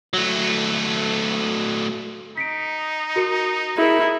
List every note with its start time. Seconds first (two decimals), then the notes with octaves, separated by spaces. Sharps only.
0.13 F#3 A3
2.37 D#4 B6 C#7 D7
3.16 F#4 A#4 C#7
3.78 E4 G#4 A#4